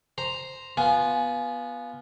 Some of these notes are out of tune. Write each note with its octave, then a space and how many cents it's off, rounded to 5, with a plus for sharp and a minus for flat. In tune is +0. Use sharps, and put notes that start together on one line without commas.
C5 +0 A#5 +0
B3 -10 F4 +0 G#5 +15